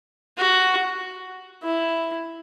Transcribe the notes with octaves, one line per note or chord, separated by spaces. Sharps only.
F#4
E4